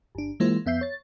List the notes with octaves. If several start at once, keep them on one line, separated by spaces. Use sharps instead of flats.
G1 D4
E3 G#3 A#3 E4 F4 C5
F2 B3 E5 G6 C7
C#5 A6